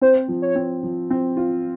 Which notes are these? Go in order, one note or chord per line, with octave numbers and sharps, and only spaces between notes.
C4 C5
F3
C#5
C4
F3
C4
F4